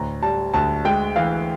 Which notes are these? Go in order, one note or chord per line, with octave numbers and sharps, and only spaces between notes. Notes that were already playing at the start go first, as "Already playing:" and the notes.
Already playing: D2 A2 A#5
G3 A5
D2 A5
G#3 G5
E3 F5